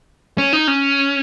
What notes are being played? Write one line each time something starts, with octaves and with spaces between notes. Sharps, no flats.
C#4
D#4
C#4